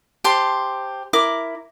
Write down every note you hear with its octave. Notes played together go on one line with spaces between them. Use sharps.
G4 C5 A5 C6
E4 A#4 D6